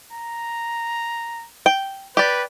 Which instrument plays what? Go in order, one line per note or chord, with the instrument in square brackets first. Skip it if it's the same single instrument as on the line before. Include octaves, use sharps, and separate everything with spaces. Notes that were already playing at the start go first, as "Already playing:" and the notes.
[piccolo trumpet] A#5
[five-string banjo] G5
[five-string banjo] G4 D5 [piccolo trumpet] B4